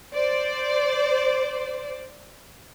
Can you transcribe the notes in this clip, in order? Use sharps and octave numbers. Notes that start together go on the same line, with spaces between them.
C5 D5